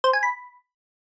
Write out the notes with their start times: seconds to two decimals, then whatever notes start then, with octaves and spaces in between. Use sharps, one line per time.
0.04 C5
0.13 G#5
0.23 B5